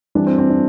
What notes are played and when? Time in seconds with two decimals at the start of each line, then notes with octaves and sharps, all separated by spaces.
0.15 E3 G3 C4 D4
0.27 C4
0.38 C4
0.50 D4